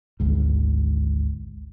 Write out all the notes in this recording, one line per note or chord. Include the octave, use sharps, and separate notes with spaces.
G#1 D2 G#2